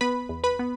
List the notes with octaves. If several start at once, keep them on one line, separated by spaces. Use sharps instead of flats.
B3 B4 B5
E2
B4 B5
B3